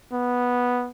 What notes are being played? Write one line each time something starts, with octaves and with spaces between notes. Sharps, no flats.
B3